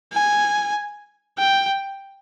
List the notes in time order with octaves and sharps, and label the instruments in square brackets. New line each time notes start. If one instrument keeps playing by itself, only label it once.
[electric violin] G#5
G5